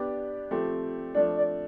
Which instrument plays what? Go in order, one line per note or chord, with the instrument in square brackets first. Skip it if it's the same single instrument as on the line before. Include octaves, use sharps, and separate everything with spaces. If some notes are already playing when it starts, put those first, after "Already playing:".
Already playing: [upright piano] B3 D4 G4 D5
F3 A3 C4 G4
[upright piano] F3 A3 D4 [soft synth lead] D5
[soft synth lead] D5